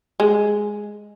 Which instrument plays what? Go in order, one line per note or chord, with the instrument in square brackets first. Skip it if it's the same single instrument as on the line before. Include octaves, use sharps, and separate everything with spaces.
[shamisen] G#3